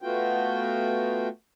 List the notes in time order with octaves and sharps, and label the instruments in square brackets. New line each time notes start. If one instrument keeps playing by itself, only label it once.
[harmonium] A3 B3 F4 F#4 G5